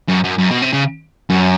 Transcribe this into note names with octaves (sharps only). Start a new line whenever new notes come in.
F#2
F#2
F#2
B2
C3
C#3
F#2